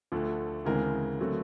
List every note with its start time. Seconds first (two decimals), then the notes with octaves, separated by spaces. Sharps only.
0.12 D2 D3 F3 A3
0.65 D2 C#3 E3 G#3 C4 A#4
1.19 D3 F#3 A3 C4